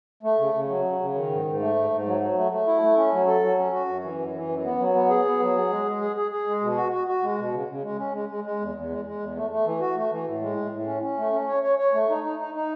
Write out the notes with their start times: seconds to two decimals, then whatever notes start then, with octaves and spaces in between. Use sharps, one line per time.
0.23 A3
0.39 C#3
0.54 C#3
0.69 F#3
0.85 C#3
0.99 C#3
1.14 D#3
1.29 G#2
1.45 G#2
1.60 A3
1.75 G#2
1.90 G#2
2.06 F#3
2.20 F#3
2.36 A3
2.52 A3
2.67 E4
2.82 A3
2.97 C#4
3.12 F#3
3.27 A4
3.43 F#3
3.58 C#4
3.72 F#4
3.88 F#2
4.03 E3
4.18 F#2
4.34 E3
4.49 F#2
4.64 B3
4.79 F#3
4.94 B3
5.10 G#4
5.25 B3
5.40 F#3
5.56 G#4
5.70 G#3
5.86 G#3
6.00 G#4
6.16 G#4
6.31 G#4
6.47 G#3
6.61 B2
6.77 F#4
6.92 F#4
7.07 F#4
7.22 G#3
7.38 B2
7.53 C#3
7.68 C#3
7.83 G#3
7.99 C#4
8.13 G#3
8.29 G#3
8.44 G#3
8.59 E2
8.75 E2
8.90 G#3
9.05 G#3
9.20 E2
9.36 A3
9.50 A3
9.65 E3
9.80 F#4
9.96 A3
10.11 E3
10.26 A2
10.42 G#3
10.57 A2
10.72 A2
10.86 C#4
11.02 C#4
11.18 A3
11.32 C#4
11.48 C#5
11.63 C#5
11.79 C#5
11.93 A3
12.09 D#4
12.24 D#4
12.39 D#4
12.54 D#4